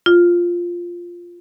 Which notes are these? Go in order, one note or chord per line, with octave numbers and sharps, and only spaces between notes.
F4